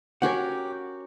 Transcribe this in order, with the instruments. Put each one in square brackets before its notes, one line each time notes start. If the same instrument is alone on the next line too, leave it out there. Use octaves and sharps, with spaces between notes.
[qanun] C#4 F#4 A#4 [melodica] G4 [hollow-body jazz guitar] C#5 F#5